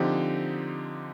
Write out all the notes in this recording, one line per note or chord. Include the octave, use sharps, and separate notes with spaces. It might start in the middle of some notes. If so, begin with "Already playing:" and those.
Already playing: D3 F3 C4 D#4 G4